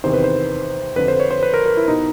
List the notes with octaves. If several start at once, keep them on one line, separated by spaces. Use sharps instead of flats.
E2 C3 D#3 C5
B4
C5
F2 D3 F3 B4
C5
C#5
C5
B4
A#4
A#4
E4
B2 D#4